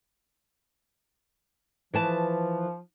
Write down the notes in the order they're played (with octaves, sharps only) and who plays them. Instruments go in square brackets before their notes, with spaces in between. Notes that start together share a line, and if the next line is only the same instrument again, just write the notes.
[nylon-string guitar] E3 B4 A5 [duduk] F3